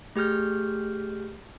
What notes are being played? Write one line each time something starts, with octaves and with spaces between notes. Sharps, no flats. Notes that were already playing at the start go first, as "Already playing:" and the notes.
A3 G4 G#4 F6 G6